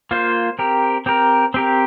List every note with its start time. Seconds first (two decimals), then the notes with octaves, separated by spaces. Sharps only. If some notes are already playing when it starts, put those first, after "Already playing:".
0.11 A#3 F4 C5
0.59 C4 G4 A#4
1.06 C4 G4 A#4
1.54 C4 G4 A#4